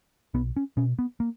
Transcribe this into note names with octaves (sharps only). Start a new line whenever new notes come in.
B1 B3
C#4
B2 C#4
B3
A#3